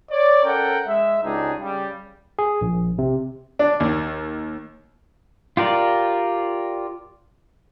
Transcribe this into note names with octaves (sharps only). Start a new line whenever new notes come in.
C#5 D5
C#4 A4 A#4 F#5 G5
G#3 E5
C#2 D4 D#4 G4 G#4
C#3 G3
G#4
A#1
C3
D4
D#2
F4 G4 A#4 D5